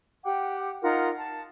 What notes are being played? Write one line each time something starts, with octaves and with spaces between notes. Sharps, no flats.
G4 F#5 G5 D6
D#4 F4 A#4 F#5
A5